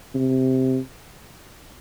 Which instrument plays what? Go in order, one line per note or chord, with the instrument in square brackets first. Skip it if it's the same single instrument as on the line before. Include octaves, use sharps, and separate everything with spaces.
[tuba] C3